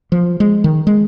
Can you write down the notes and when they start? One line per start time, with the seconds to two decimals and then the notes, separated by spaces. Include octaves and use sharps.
0.12 F3
0.40 G#3
0.64 D#3
0.87 G#3